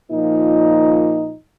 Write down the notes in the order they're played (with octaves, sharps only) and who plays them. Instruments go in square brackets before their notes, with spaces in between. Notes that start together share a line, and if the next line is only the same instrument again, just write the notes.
[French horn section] A#2 F3 A#3 D#4